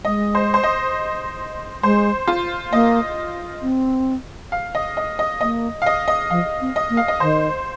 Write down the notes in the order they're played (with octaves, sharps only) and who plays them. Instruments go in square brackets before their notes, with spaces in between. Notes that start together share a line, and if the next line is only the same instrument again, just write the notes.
[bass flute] G#3 [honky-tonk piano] D#5
[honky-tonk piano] C5
C5
D#5
[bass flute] G#3 [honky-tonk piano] C5
[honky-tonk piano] F4
[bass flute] A#3 [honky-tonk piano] D#5
[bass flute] C4
[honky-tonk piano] F5
D#5
D#5
D#5
[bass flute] A#3 [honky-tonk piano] D#5
[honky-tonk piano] F5
D#5
D#5
[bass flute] F3 [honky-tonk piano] F5
[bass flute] C4
[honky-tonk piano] D#5
[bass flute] A#3
[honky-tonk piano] F5
D#5
[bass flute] D#3 [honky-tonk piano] C5